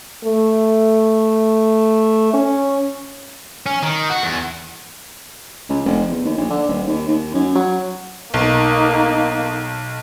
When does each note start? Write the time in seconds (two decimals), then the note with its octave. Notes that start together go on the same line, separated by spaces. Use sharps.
0.24 A3
2.33 C#4
3.66 C#4
3.83 D#3
4.10 F#4
4.23 E2
5.69 C#2
5.85 F1
6.10 E2
6.25 D#2
6.38 A#1
6.50 D3
6.68 D#1
6.87 D#2
7.08 D#2
7.34 F#2
7.55 F#3
8.34 B1 A#3 D#4